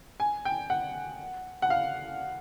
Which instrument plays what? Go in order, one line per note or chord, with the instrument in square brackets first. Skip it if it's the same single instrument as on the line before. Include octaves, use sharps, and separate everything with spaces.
[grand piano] G#5
G5
F#5
F#5
F5